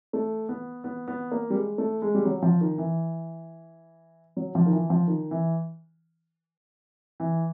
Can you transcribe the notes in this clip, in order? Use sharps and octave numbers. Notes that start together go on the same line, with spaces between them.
A3
B3
B3
B3
A#3
G3
G#3
A3
G#3
G3
F#3
F3
D#3
E3
F#3
F3
D#3
E3
F3
D#3
E3
E3